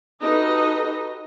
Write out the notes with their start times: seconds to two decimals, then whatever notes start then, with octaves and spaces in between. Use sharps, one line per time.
0.22 D#4 F#4 G4 A4 B4 D#5